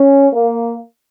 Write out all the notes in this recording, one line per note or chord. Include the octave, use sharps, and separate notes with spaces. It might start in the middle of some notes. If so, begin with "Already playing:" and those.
Already playing: C#4
A#3